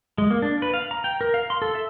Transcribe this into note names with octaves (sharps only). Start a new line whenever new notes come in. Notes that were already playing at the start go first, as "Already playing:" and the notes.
G#3
A#3
D4
B4
F5
A#5
G5
A#4
F5
C6
A4
E5